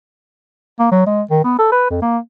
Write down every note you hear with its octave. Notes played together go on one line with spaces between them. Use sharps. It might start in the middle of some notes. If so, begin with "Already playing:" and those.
A#3
F#3
G#3
D#3
B3
A4
B4
F2
A#3